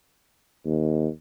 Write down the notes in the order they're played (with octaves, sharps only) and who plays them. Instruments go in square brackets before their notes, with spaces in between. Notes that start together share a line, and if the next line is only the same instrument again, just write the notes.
[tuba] D#2